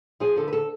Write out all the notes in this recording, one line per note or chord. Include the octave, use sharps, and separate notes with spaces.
F3 G#4
D3 A4
B4
A4